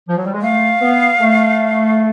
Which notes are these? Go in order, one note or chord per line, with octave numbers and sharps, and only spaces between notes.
F3
F#3
G3
G#3
A3 F5
B3
A3